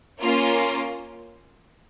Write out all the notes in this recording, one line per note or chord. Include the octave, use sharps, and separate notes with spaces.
A#3 C#4 F4